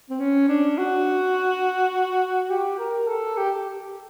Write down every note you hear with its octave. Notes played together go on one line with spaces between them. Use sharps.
C4
C#4
D4
F#4
G4
A#4
A4
G4